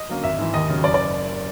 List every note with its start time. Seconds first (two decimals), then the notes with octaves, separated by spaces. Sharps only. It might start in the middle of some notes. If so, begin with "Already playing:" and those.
Already playing: D#5
0.09 D3 F#3 A#3 C#4
0.24 G#1 E5
0.38 G#2 E3
0.54 D#2 D#5
0.69 C#3 F#3
0.84 F#1 D5
0.94 D5